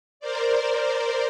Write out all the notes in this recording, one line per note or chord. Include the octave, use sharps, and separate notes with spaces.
A#4 C5 D5